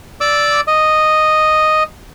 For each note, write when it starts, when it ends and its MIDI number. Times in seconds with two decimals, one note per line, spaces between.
0.21 0.61 74
0.21 0.61 86
0.21 0.61 88
0.67 1.83 75